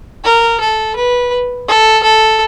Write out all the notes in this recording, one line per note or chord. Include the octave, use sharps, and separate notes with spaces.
A#4
A4
B4
A4
A4